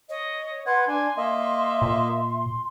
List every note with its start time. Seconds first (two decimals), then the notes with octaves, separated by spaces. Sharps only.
0.09 C#5 D#5
0.66 B4 F#5 C6 G#6
0.87 D4 G#5
1.17 A#3 D#5 E5
1.82 A#2